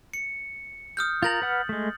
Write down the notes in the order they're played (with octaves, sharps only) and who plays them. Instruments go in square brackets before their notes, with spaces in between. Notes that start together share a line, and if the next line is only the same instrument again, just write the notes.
[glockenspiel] C#7
D#6 F6 G6
[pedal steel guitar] F4 A#4 A#5 [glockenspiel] G6 A6 F#7
[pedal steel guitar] B4 F#5 F6
G#3 A3